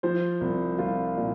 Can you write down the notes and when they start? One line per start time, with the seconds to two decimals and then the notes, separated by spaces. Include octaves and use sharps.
0.03 F3 C5
0.41 C2
0.78 C2 F4
1.17 A#2